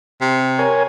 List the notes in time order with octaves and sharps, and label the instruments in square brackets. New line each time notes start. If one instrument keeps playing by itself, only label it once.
[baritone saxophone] C3
[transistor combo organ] A#4 C#5 G#5